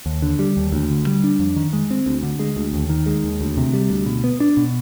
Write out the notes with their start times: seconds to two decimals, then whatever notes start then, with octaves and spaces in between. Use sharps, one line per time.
0.06 D#2
0.22 D3
0.39 G3
0.57 D#2
0.72 D2
0.90 D3
1.07 G3
1.24 D4
1.39 F2
1.56 D#3
1.73 G#3
1.91 C4
2.06 D2
2.23 D3
2.39 G#3
2.57 D2
2.73 D#2
2.89 D#3
3.06 G#3
3.24 D#2
3.41 D2
3.57 C3
3.74 G3
3.90 D2
4.06 B2
4.24 B3
4.40 D4
4.57 B2